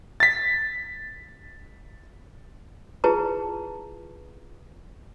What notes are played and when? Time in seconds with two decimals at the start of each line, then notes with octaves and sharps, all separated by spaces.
0.20 A6 B6
3.04 E4 F4 G#4 B4 A5 A#5